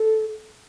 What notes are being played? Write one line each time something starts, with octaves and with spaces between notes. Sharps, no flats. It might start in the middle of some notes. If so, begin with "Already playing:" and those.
Already playing: A4